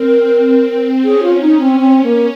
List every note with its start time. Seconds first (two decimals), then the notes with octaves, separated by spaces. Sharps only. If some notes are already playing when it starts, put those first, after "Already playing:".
Already playing: C4 A#4
1.04 C#4 G#4
1.23 F4
1.41 D#4
1.60 C4
1.79 C4
2.03 A#3